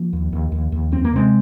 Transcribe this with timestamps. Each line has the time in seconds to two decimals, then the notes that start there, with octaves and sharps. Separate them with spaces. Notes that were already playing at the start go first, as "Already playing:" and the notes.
Already playing: F3 A#3
0.13 D#2
0.33 D#2
0.52 D#2
0.72 D#2
0.92 F2 C4
1.05 A#3
1.13 C3 G#3 C4